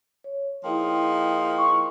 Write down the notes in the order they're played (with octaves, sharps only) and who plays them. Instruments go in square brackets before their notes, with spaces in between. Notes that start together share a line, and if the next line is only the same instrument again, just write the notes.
[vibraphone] C#5
[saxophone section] F3 A#3 D#4 [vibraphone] E4 G#4 G5
[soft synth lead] C#6